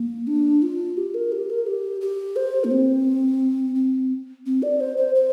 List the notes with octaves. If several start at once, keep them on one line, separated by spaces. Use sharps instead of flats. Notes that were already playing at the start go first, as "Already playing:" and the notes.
Already playing: A#3
D4
F4
G4
A#4
G4
A#4
G4
G4
C5
A#3
C4
C4
C4
D5
C5
C5
C5